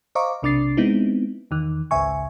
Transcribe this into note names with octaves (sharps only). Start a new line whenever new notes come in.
C5 D#5 F5 A#5 C#6 D6
B1 C3 D4 D6 A6 C7
G#3 B3 C4 D#4 E4
E2 D#3
G#1 C#2 C#3 E5 G#5 C#6